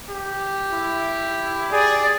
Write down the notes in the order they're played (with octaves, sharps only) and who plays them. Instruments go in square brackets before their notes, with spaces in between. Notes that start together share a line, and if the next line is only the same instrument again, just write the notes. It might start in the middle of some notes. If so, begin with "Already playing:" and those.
[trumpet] G4
[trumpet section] E4
[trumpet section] G#4 [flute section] D5